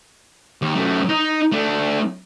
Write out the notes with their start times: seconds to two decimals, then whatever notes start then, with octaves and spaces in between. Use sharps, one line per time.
0.62 D#2
0.75 F#2 A3
1.09 D#4
1.52 A3 D4